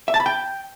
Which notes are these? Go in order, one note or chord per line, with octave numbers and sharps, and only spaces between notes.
E5
A5
B5
G5